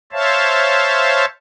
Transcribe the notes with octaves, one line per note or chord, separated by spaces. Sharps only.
C5 C#5 E5 F5 A5